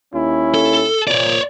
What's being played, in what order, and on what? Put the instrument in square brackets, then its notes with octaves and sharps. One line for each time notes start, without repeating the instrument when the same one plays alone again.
[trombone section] D#2 C#4 E4
[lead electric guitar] A4
[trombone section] A#2 [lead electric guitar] C#5 D5